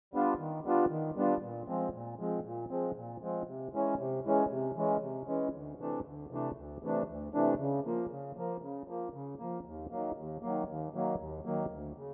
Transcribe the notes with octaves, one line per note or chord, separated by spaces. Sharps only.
G3 B3 D4 F4
D#3
G3 B3 D4 F4
D#3
G3 B3 D4 F4
A#2
F3 G#3 C4
A#2
F3 G#3 C4
A#2
F3 G#3 C4
A#2
F3 G#3 C4
C3
E3 G#3 C#4
C3
E3 G#3 C#4
C3
E3 G#3 C#4
C3
E3 G#3 C#4
D2
C3 E3 A3 D4
D2
C3 E3 A3 D4
D2
C3 E3 A3 D4
D2
C3 E3 A3 D4
C#3
F3 A#3
C#3
F3 A#3
C#3
F3 A#3
C#3
F3 A#3
D#2
D#3 F#3 A#3
D#2
D#3 F#3 A#3
D#2
D#3 F#3 A#3
D#2
D#3 F#3 A#3
D2
C#3